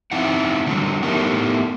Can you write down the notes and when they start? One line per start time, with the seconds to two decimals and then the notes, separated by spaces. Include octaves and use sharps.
0.11 C4 D#4 E4 F#5
0.67 D3 E3 F#3 G3
1.03 A3 B3 D#4 E4 G4 A#4